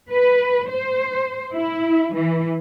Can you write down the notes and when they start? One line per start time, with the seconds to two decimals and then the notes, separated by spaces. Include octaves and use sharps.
0.11 B4
0.70 C5
1.54 E4
2.15 E3